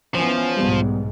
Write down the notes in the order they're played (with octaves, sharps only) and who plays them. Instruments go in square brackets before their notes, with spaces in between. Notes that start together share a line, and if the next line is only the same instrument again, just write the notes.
[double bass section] E3 B3 C#4 [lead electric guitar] F3
[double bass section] B1 G#2 [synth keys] G3 B3